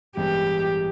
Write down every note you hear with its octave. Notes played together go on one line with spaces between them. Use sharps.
A1 G2 E3 G#3 B3 G4